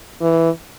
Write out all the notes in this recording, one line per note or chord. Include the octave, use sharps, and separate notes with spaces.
E3